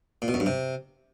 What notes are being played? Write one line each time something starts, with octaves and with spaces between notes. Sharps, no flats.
A#2
B2
F#2
G2
C3